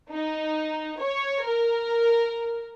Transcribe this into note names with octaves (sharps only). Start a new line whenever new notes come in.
D#4
C#5
A#4